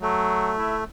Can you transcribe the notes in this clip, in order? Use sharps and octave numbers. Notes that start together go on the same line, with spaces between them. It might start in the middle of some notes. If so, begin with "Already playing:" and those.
F#3 A3
E4